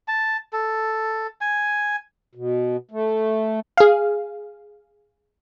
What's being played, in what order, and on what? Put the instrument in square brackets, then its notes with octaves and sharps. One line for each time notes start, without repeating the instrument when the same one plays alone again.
[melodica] A5
A4
G#5
[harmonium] B2
A3
[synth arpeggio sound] G#4 F5